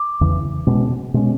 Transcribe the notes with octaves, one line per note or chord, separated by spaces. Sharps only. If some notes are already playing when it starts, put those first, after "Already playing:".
Already playing: D6
E2 C#3 E3
B2 G#3 C#4
B2 G#3 C#4